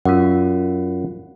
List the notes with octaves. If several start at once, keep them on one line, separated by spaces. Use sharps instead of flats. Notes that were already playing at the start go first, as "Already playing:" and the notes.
F#2 F4 F#5